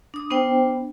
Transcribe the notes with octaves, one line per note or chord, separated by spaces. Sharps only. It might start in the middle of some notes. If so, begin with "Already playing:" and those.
D4 D#6
B3 D4 C5 G5